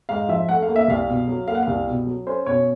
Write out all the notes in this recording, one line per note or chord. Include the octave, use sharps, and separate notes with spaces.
G#2 F5
F3 E5
A3 F#5
F5
A#3
E5
C2 F5
B2
F#3
A#3 F5
F#5
C2 F5
B2
F#3
C#4 C5
B2 C#5